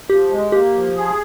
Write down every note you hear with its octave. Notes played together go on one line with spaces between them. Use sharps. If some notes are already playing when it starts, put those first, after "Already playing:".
F3 G4
G#3
A#3 G4
F3
G#4